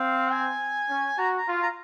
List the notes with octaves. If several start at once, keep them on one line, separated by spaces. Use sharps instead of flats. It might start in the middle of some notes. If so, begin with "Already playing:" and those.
Already playing: C4 F5
G#5
C#4
F#4 A#5
A#5
F4
A#5